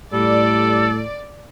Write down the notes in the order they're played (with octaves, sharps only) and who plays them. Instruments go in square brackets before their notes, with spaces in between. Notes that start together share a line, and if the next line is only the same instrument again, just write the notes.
[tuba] A2 [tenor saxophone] G3 [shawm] A4 [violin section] D5